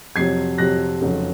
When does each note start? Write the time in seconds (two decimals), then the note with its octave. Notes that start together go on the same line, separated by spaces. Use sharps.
0.16 F2 C3 F#3 G#6 C7
0.58 F2 C3 F#3 F#6 A#6
1.01 F1 F2 C#3 F#3